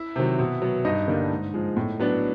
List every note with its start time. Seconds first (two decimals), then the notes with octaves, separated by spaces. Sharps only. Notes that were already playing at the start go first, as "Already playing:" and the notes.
Already playing: E4 E5
0.16 C3 D#3 F#3
0.39 B2
0.62 F#3 B3
0.85 G2 D#4 D#5
1.08 D3 G3 A#3 D4
1.30 G#2
1.54 F3 G#3
1.77 A2
2.00 F#3 B3 D4